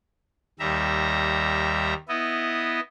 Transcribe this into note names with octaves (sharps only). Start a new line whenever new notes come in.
D#2 G3 E5 A#5
B3 E4 D#5